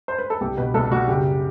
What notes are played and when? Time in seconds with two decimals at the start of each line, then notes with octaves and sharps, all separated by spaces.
0.08 C5
0.19 B4
0.30 A4
0.41 C2 G4
0.57 B2 B4
0.74 C2 A4
0.91 G3 F#4
1.08 F#1 G4